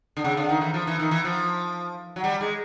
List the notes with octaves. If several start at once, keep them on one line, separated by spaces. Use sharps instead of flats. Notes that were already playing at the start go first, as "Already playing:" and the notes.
D3
C#3
D3
D#3
E3
F3
E3
D#3
E3
F3
F#3
G3
G#3